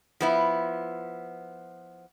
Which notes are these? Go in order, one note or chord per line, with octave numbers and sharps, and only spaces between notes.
F3 B3 E4